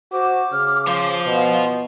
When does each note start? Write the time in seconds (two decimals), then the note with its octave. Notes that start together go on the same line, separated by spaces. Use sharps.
0.12 F#4 C5 D6
0.52 C#3 F6
0.87 F3 C5 F5
1.26 B2